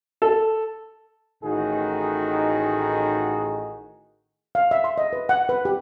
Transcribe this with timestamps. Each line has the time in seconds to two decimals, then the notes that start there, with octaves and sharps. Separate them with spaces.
0.22 A4
1.43 A1 A2 D#3 D#4 F#4 G#4
4.55 F5
4.71 E5
4.84 C6
4.98 D#5
5.13 B4
5.29 F#5
5.49 B4
5.65 G4